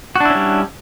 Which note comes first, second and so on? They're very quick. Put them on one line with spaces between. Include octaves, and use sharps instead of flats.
F#4 D4 E4 C#4 G3